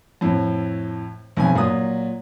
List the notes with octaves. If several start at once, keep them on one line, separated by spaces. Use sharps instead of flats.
F2 A2
B1 F2 G#5
A#2 F#3 D#6